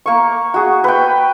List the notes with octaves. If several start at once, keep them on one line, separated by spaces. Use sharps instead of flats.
A#3 C#6
F#4 G#4
B4 G5